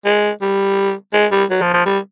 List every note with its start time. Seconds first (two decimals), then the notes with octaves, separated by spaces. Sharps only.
0.05 G#3
0.41 G3
1.13 G#3
1.32 G3
1.50 F#3
1.62 F3
1.74 F3
1.86 G3